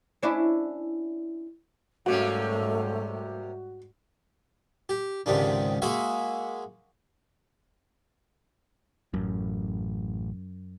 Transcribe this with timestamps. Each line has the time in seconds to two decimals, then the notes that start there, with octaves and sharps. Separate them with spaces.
0.23 C#4 D4 E4
2.06 G#2 C3 G3 A3 A#3 C#4 F#4
4.89 G4
5.26 C#2 G#2 C3 D#3 D4
5.82 G#3 A#3 F#4 G#4 E5 F#5
9.14 A1 F#2